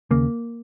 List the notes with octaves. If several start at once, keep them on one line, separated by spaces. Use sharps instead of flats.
D#2 C#3 A#3